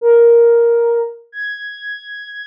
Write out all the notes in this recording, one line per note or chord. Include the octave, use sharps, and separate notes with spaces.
A#4
G#6